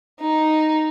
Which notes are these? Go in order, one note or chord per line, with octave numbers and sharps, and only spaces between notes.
D#4